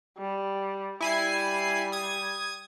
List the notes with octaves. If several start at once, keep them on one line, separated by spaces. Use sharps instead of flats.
G3
G3 E4 G#5 C7
D#6 G#6